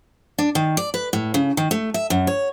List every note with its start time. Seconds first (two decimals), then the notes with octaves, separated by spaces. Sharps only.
0.38 D4
0.55 D#3
0.77 D5
0.94 B4
1.13 A2
1.34 C#3
1.57 D#3
1.71 A3
1.94 E5
2.10 F#2
2.27 C#5